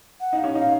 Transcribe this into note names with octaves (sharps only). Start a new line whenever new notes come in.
F#5
D#4
F5
C#4
D#4 F5